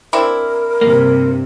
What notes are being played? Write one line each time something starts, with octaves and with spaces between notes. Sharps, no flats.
C4 D4 E4 A#4
G2 C3 A#3